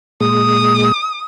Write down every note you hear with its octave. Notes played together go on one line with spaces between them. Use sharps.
A#2 G#3 D#6